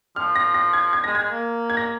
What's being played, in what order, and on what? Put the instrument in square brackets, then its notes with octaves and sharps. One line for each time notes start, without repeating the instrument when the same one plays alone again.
[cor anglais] F3 [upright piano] F6
[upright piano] A#6
A#6
G#6
G#6
[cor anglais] G#3 [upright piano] A#6
[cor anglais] G#3 [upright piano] G#6
[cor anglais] A#3
[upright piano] G#6
A#6